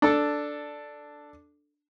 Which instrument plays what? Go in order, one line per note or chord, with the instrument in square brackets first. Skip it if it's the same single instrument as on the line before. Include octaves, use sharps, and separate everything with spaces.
[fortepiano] D4 A4